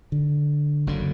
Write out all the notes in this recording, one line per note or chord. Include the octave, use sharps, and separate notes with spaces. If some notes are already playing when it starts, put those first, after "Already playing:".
D3
F#1 F#2 D3